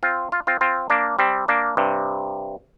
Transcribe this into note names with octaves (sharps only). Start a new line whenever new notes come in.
C4 F4
F4
C4 F4
C4 F4
A#3 D4
G3 C4
A#3 D4
G2 C3